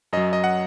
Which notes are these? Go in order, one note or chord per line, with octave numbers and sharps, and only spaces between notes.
F#2 F#3 D#5
D#5
F#5